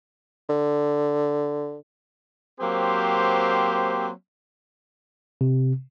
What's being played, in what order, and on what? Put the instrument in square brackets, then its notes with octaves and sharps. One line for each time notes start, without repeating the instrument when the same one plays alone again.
[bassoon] D3
[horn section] F#3 A#3 C4 G4 C5
[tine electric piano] C3